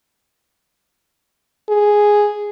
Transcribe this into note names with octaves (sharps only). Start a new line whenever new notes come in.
G#4